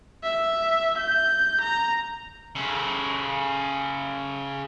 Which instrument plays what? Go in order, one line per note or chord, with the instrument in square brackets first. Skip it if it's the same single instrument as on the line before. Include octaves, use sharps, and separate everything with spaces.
[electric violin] E5
G6
A#5
[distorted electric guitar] C#3 A4